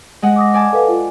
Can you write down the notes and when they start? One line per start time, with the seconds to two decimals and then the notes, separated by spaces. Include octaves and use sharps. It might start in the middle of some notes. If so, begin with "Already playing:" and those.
0.22 G#3 D#5 F#5
0.36 D6 D#6 A#6
0.54 D5 G#5 A5
0.73 A4 B4 F5
0.88 F4